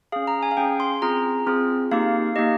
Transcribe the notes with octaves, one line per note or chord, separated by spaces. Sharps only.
C#4 G#4 F5
A#5
G#5
F5
C#4 G#4 G5
C6
C4 F4 G#4 A#5
C4 F4 G#4
A#3 D#4 G4 F5
A#3 D#4 G4 D#5